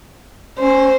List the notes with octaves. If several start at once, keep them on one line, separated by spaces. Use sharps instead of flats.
C#4 C5